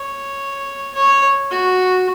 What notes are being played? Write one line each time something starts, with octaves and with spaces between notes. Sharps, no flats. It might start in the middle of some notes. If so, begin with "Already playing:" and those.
Already playing: C#5
C#5
F#4